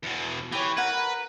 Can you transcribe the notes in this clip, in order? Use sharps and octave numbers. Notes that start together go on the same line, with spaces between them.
E2 B2
E3 G4 C#5
A#4 B4 F#5 B5